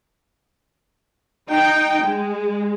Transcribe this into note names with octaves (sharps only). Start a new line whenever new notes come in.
D#4 G5
G#3